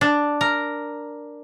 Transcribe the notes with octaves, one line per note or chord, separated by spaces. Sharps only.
D4
A#4